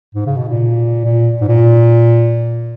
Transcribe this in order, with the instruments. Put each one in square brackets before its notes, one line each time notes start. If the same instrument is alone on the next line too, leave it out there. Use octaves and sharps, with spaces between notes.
[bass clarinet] G#2
C#3
B2
A#2
A#2
G#2
A#2